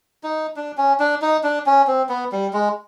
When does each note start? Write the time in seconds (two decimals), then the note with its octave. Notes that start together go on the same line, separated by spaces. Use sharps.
0.23 D#4
0.56 D4
0.78 C#4
1.00 D4
1.22 D#4
1.44 D4
1.66 C#4
1.87 C4
2.09 B3
2.32 G3
2.53 G#3